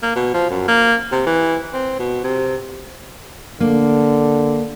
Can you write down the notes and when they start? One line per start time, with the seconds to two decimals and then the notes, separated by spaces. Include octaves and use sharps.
0.03 A#3
0.16 B2
0.34 F3
0.50 F#2
0.68 A#3
1.12 C3
1.26 E3
1.73 C4
1.99 B2
2.24 C3
3.60 D3 A#3